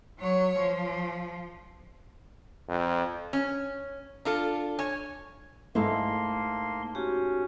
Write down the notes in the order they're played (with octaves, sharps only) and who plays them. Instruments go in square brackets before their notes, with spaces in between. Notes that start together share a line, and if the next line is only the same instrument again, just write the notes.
[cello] F#3 C#5
F3
[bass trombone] F2
[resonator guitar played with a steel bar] C#4
D4 F4 A4
C#5 G#5
[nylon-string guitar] G#2 E4 [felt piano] A3 [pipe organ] A#3 C6 [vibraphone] A5
[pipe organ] C#4 [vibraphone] F#4 G4